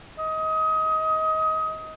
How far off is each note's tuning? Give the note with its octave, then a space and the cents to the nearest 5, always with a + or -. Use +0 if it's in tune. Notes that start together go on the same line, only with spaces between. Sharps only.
D#5 +25